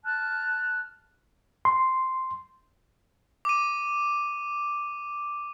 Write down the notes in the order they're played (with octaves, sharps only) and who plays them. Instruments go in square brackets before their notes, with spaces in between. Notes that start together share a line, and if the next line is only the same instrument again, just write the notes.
[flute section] A5 F6 F#6
[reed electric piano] C6
[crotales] D6 D#7